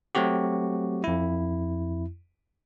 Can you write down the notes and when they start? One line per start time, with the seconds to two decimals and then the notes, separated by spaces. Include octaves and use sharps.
0.15 F#3 A3 C4 F#4 G4
1.04 F2 E4